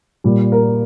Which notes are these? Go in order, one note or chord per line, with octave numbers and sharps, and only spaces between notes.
A#2 G3
A#4